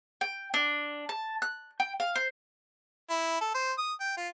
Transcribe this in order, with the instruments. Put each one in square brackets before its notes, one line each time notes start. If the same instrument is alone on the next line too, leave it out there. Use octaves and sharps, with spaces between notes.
[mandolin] G5
D4
A5
F#6
G5
F5
C5
[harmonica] E4
A4
C5
D#6
G5
F4